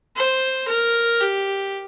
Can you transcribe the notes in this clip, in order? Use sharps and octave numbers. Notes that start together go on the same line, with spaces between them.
C5
A#4
G4